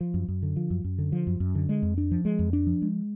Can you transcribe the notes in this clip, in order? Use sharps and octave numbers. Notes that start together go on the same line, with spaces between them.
F3
F#2
F#2
D3
F3
F#2
F#2
D3
F3
F#2
F#2
D3
G#3
F2
D4
F3
G#3
F2
D4
F3
G#3